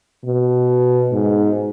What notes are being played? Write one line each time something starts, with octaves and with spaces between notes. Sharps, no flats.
B2
G#2